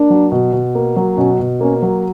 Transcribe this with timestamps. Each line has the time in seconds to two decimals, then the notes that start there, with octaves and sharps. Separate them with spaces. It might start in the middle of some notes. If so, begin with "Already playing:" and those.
Already playing: A#3 D4
0.10 F#3
0.32 B2
0.53 B2
0.75 A#3
0.96 F#3
1.17 B2 C#4
1.39 B2
1.61 A#3 C#4
1.82 F#3